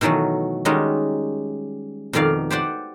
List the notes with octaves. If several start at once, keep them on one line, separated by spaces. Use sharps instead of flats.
B2 D#3 E3 F#3 A3
D#3 G3 G#3 C#4 D#4 F#4
F2 B2 D#3 D5 F5
G4 C5 D5 F#5